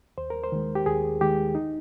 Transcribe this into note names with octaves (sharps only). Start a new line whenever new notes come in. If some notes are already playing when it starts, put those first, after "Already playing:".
D#2 C5
A#4
C5
D#3 G#3
G4
D#2 G#4
D#3 G#3 G4
D#4